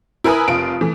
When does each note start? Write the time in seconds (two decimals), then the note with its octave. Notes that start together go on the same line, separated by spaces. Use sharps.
0.24 E4 A#4 B4 G#5 B5 D#6
0.48 F1 F4 D7
0.81 E3 A3